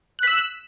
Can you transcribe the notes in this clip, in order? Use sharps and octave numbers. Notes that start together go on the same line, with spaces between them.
E6 F#6 B6